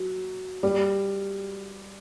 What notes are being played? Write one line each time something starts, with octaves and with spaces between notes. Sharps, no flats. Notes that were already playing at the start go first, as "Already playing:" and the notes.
Already playing: F#3
G3